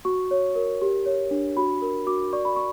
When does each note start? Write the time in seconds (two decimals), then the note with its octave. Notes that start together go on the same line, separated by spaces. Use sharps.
0.05 F#4 C#6
0.31 C#5
0.55 A#4
0.82 G4
1.06 C#5
1.31 D4
1.56 F#4 B5
1.82 A#4
2.07 F#4 D6
2.33 D5 C#6
2.45 B5
2.56 C#6